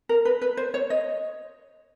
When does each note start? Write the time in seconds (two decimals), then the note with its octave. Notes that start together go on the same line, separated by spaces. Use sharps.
0.09 A#4
0.25 B4
0.42 B4
0.57 C5
0.74 C#5
0.90 D#5